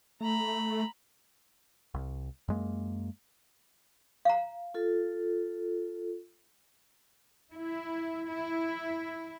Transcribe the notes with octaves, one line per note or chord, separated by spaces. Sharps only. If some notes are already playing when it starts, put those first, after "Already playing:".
A3 A#5 B5
C2
F#2 G#3 A#3
F5 A#5
F4 A4
E4
E4